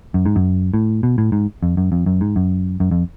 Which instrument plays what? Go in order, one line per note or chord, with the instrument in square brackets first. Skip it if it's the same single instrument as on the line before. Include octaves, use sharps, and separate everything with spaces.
[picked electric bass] F#2
G#2
F#2
A2
B2
A2
G#2
F2
F#2
F2
F#2
G#2
F#2
F#2
F2